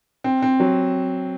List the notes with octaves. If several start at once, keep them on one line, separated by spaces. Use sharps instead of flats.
C4
C4
F#3